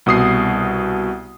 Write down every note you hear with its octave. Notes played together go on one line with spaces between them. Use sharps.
C2 B2 D#6 C7